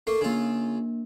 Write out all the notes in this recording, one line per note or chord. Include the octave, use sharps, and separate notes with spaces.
A3 A#3 C7
C#3 A#3 D4 F4